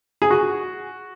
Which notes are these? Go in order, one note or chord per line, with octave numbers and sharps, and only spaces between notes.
G#4
F#4